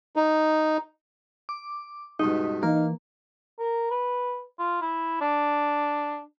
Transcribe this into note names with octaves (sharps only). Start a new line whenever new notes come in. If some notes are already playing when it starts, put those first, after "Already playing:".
D#4
D6
C#2 G2 B2 D#4
E3 A#3 D#4 F5
A#4
B4
F4
E4
D4